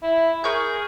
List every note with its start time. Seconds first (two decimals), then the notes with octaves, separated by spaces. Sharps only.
0.03 E4
0.44 G#4 A#4 C#6 G6